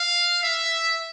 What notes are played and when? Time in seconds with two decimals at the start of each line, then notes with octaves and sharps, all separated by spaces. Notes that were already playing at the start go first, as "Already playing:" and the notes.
Already playing: F5
0.43 E5